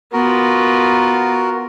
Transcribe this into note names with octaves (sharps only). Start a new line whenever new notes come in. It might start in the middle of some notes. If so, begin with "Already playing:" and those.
B3 F4 F#4 A#4